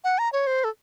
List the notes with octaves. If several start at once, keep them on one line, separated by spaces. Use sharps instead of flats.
F#5
A#5
C#5
C5
A4